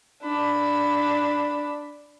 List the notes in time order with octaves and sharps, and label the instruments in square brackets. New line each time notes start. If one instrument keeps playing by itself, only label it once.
[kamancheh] D4 B5